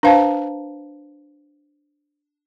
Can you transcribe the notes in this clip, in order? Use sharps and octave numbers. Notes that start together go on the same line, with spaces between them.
D4 B4 C5 F5 A5